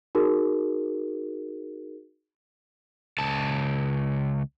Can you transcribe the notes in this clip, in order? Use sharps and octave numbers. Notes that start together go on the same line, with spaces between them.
D#4 F#4 G#4 A#4
C#2 A5